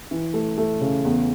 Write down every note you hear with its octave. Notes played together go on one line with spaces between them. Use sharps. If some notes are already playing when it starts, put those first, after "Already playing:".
E3
A3
A3
C#3
E2